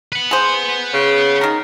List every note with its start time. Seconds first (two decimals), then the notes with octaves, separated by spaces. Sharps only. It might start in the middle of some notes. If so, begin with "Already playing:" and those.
0.13 B4 F#5
0.31 G#4 C5
0.93 C#3
1.41 D#3 A#4